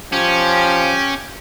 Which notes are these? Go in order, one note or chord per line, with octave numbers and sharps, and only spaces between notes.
F3 C#4 G4